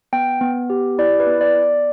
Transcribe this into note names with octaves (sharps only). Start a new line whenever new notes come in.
B3 G5
B3
G4
E4 D5
B4
B3
D5
B3
D5